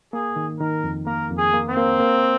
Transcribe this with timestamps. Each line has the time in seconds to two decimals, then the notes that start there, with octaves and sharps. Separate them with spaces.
0.13 A#3 G#4
0.36 D#3
0.60 D#3 A#4
0.84 F2
1.06 A#3 A#4
1.31 F2
1.38 G#4
1.54 A#3
1.69 C4
1.77 A#3
2.00 A#3